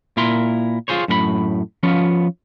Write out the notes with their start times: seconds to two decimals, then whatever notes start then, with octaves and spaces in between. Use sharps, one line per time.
0.17 A#2 E4 A#4 C6
0.88 F4 F#4 G#4 C5 C#5
1.08 F#2 A2 A#4 B5
1.83 F3 B3 C#4 F4